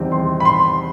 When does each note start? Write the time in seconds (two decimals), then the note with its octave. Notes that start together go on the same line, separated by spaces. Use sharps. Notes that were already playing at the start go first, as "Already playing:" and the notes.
Already playing: E2 C3 D#3 G3 C4
0.12 C6
0.40 B5
0.45 C6